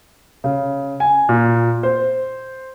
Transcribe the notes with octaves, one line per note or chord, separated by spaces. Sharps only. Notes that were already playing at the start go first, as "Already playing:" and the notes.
C#3
G#5
A#2
C5